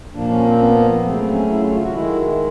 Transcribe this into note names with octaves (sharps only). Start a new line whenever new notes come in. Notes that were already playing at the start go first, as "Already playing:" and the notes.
A#2 F3 A#3 D4
C#4
C4
B3
C#3 F#3 A3 C4
C#4
E4
F4
F4
F#4
D#3 G#3 E4